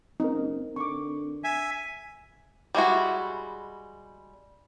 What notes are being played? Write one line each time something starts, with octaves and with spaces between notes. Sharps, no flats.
F#1 C4 D#4 A#4
D3 C#6 D6
E5 G#5
G3 G#3 E4 F#4